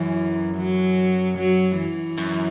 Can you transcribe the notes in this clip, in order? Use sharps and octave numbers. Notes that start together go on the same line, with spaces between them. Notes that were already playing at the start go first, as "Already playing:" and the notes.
Already playing: F#2 E3
F#3
F#3
E3
F#2